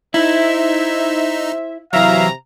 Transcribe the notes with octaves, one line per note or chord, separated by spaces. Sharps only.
D#4 E4 C5 E5
C3 E3 F#3 E5 F5 A#5